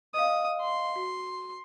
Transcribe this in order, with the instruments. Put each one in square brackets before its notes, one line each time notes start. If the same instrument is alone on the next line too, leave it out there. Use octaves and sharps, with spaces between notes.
[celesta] D#5 F5 [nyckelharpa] D#6
[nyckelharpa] C6
[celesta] F#4